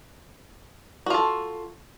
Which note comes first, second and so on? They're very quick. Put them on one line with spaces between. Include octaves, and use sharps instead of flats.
F#4 F4 A4